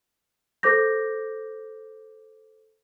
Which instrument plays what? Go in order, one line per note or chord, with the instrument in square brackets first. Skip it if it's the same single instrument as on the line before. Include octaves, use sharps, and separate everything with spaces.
[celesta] A4 C5 D6 G6 A#6